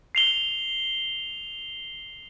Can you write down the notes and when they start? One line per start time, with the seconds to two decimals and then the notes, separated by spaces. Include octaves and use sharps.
0.15 C7 F7 G7